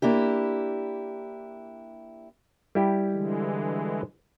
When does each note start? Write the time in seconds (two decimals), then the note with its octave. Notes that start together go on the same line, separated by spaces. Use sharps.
0.02 A#3 D4 E4 G4
2.75 G3 E4 G4
3.12 D3 E3 G#3